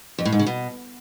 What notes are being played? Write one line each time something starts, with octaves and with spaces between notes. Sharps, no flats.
F2
A2
G#2
C#3
B2